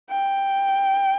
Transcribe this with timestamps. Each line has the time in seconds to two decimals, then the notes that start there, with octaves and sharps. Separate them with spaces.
0.11 G5